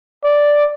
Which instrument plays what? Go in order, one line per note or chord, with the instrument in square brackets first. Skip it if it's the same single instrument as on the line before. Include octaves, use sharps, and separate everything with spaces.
[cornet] D5